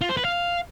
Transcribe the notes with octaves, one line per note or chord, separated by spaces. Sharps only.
F4
C5
B4
F5